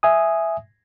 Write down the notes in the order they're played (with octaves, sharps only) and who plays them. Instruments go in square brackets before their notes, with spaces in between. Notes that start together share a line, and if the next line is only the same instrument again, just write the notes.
[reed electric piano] E5 G#5 D#6